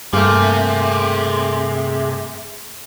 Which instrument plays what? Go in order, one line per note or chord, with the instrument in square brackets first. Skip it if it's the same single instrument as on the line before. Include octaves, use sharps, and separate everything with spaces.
[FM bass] G2 [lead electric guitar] C3 [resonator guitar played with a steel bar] A3 A#3 [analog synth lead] G#4